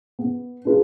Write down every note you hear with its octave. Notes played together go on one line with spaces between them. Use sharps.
B3
D4 F4 G#4 B4